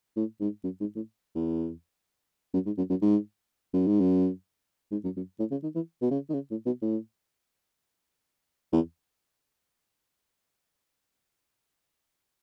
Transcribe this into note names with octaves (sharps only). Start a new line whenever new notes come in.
A2
G#2
F#2
G#2
A2
E2
F#2
G#2
F#2
F#2
G#2
F#2
G#2
F#2
G#2
F#2
F#2
A2
C#3
D#3
E3
B2
C#3
D#3
C#3
A2
B2
A2
E2